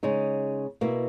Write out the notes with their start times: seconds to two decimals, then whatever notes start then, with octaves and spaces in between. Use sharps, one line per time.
0.03 C#3 G#3 D#4
0.81 B2 A#3 E4